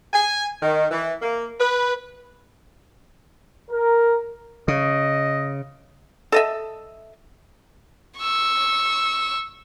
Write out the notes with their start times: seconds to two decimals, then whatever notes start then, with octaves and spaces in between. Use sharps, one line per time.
0.13 G#5
0.61 D#3
0.91 E3
1.21 A#3
1.59 B4
3.71 A#4
4.68 C#3 D#5
6.32 A4 D#5 E5
8.18 C#6 E6